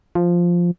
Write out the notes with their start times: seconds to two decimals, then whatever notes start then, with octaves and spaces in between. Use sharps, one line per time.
0.15 F3